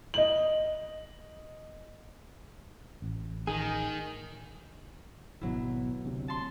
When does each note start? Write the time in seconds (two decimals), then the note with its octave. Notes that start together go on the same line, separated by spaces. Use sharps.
0.14 D#5 F#7
3.02 A1
3.47 D#3 G#4
5.41 G#1 B2 F#3 E4
6.05 D2 C3
6.28 A5 C6